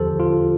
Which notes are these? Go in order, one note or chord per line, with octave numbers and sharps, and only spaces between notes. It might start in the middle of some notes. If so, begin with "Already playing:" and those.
Already playing: E2 D3 F3 G4 A4 C5
F4